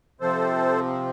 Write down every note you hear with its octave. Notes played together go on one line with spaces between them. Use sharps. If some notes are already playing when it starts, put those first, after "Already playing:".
C3 F3 C4 A4 C5